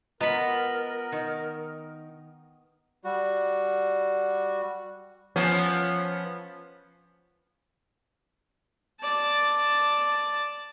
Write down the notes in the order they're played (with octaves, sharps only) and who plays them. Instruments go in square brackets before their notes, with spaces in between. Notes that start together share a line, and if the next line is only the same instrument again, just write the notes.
[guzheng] B3 B5 [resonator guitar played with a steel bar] F4 D#5 A#5 [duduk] A#4
[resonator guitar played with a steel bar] D#3
[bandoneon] G3 F#4
[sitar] F3 B3 C#4
[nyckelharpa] D5 A5